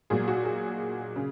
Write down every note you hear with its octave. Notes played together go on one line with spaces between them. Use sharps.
A#2 F#3 G#4
F#4
G#4
C#3